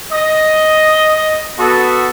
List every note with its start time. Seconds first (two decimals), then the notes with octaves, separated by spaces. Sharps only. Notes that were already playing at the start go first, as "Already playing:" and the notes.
0.12 D#5
1.59 B3 F#4 A4